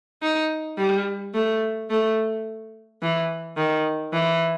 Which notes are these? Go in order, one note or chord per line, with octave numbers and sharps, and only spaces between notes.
D#4
G3
A3
A3
E3
D#3
E3